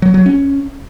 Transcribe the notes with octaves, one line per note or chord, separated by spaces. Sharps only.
F#3
F#3
C#4